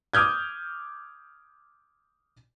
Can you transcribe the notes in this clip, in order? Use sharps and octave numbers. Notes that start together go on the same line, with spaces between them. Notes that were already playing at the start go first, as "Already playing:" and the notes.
D6 D#6 F6 G6 G#6